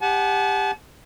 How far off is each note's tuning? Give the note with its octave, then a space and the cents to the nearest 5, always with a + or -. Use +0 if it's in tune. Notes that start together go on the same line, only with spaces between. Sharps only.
G4 +20 F#5 +0 A5 -40